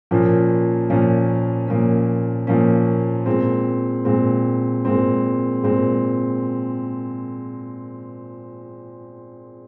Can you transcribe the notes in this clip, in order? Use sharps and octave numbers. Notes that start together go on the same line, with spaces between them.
A#2 F3 A#3 C#4
A#2 F3 A#3 C#4
A#2 F3 A#3 C#4
A#2 F3 A#3 C#4
A#2 G#3 C4
A#2 G#3 C4
A#2 G#3 C4
A#2 G#3 C4